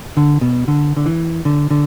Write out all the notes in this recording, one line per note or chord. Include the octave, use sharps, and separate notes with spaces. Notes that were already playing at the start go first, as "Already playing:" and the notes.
D3
B2
D3
D3
E3
D3
D3